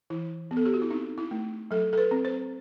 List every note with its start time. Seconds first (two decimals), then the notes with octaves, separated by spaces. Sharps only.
0.10 E3 E4
0.51 B3
0.57 A4
0.65 G4
0.74 F#4
0.82 E4
0.90 C4 D#4
1.18 E4
1.31 A3
1.71 F#3 A4
1.93 A4
1.98 B4
2.11 C4
2.25 C5